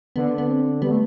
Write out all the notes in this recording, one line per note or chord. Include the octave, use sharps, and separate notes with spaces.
D3 B3
B3
C4
G3 B3
A3